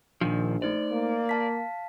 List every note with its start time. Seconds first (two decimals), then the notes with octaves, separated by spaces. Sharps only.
0.21 A#1 A#2 D#3 F3 D4
0.62 A3 D#4 C5 D5
0.92 A#3
1.29 F5 A5 B6